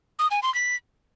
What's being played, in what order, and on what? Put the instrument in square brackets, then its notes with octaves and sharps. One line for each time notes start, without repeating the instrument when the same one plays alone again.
[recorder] D#6
G#5
C6
B6